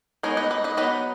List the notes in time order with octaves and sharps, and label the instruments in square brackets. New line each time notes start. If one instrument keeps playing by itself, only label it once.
[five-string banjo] G#3 B3 D#4 A#4 C#5
B4 D#5
B4 D#5
B4 D#5
F#3 B3 D#4 B4 D#5